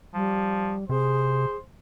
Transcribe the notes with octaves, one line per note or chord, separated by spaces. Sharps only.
F3 G3
C3 G#4 C5